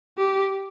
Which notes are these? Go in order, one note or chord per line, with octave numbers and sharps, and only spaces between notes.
G4